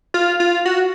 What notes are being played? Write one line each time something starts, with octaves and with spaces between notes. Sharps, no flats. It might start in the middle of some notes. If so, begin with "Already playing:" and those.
F4
F4
F#4